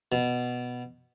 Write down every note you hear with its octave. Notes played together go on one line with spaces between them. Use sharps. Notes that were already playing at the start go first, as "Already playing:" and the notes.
B2